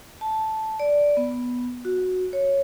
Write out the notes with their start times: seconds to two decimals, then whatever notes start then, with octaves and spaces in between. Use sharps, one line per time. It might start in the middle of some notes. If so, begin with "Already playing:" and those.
0.21 A5
0.80 D5
1.17 B3
1.85 F#4
2.33 C#5